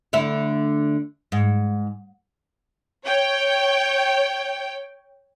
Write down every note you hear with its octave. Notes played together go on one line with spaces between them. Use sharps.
D3 A3 E4
G#2
C#5 G5